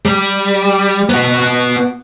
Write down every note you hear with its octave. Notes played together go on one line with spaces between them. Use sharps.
G3
B3 F#4